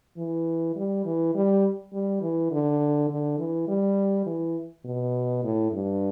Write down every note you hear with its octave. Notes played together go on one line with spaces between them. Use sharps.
E3
G3
E3
G3
G3
E3
D3
D3
E3
G3
E3
B2
A2
G2